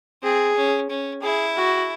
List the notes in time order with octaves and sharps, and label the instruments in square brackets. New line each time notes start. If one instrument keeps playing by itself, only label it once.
[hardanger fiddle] C4 [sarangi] G#4
[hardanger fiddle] C#4
C#4
[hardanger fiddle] E4 [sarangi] G#4
[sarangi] F#4